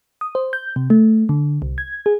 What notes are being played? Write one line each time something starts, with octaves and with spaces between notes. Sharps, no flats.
D#6
C5
G6
C3
A3
D3
C2
G#6
G#4